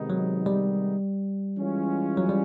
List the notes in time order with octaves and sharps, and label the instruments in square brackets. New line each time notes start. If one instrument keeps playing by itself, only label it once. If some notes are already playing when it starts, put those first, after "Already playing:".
Already playing: [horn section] C3 D#3 G#3 B3 D#4
[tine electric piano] F#3
G3
[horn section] E3 G#3 C#4 F4
[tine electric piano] F#3
G3